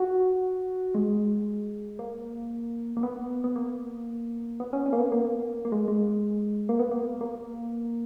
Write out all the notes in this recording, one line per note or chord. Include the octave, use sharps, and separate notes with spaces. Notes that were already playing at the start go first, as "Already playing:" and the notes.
Already playing: F#4
G#3
A#3
A#3
B3
B3
A#3
B3
C#4
C#4
A#3
B3
A#3
A#3
G#3
G#3
A#3
B3
A#3
A#3